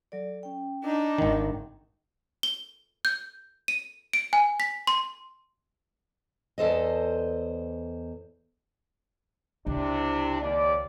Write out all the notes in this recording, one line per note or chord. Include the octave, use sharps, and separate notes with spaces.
F#3 A4 D5
C#4 G5
D4 D#4 D6
G#1 D#3
G7
G6
D#7
D7
G#5
B6
C6
E2 A4 C5 D#5
C#2 C3 D4 E4
D#2 D5